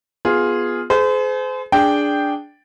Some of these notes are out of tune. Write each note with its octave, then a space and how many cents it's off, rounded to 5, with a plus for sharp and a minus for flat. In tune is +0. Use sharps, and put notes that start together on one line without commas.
B3 +0 F4 +5 G#4 +0
G#4 +40 C5 -35
D4 -5 G#4 -5 G5 +0